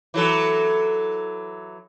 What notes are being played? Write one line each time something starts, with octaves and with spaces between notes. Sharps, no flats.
E3 F#3 A4